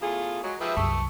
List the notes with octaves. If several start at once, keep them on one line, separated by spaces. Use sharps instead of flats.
E2 A3 F4 G#4
F#3 G#3
F3 G4 G#4 B4 E5
C2 F#2 A5 C#6